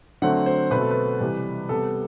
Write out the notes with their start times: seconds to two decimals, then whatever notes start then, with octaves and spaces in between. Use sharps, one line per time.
0.22 D3 F#3 A3 C4 F#5
0.46 C5
0.71 B2 A3 C4 B4
0.81 A4
0.91 B4
1.20 C3 E3 G3
1.69 C3 G3 B3 A4